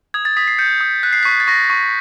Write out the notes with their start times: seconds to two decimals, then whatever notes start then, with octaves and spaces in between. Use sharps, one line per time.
0.14 D#6 G#6
0.25 A6
0.37 D#6 B6
0.47 C7
0.59 G6 C#7
0.81 D#6
1.03 F#6 B6
1.13 C7
1.23 C#6 B6
1.40 A6
1.47 C#6 A#6
1.70 C#6